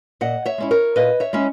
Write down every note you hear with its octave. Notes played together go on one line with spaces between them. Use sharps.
A#2 D#5 F#5
C#5 E5
G#3 C#4 E4
A#4 C#5
A#2 B4 D#5
C#5 E5
G#3 C#4 E4